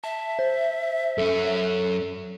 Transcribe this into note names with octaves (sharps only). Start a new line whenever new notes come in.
E5 A5
C5
F#2 C#4 A4